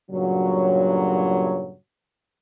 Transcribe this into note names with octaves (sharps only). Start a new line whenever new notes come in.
G2 A#2 C#3 F#3